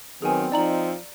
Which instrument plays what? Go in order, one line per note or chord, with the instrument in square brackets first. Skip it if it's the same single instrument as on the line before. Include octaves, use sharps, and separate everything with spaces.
[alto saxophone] D#3 [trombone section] F#3 B3 [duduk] C4 [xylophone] G#4 G#5
[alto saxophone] F3 [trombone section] D#4 [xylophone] D5 A#5 F#7